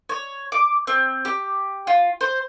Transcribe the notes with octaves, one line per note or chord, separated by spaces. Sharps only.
C#5
D6
C4
G4
F4
C5